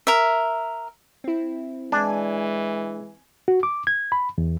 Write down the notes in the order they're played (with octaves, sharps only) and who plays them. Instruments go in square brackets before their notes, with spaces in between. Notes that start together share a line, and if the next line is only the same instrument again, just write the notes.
[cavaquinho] A#4 E5
[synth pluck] C4 E4
[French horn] E3 [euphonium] G#3 [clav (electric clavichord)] D4 [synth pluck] G#5
[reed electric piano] F#4
D6
G#6
B5
E2